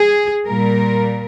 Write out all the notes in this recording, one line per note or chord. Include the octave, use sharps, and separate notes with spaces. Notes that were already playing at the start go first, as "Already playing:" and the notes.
Already playing: G#4
A#2 G3 A#4